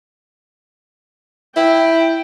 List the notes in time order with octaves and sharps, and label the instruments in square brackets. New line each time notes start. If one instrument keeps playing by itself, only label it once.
[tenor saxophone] E4 [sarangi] G5